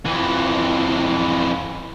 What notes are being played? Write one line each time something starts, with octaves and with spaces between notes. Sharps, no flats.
F2 E3